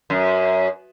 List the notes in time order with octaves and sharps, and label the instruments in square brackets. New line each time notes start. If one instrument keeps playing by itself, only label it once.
[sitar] F#2